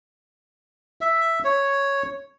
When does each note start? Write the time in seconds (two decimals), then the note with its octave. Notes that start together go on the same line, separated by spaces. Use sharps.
1.01 E5
1.44 C#5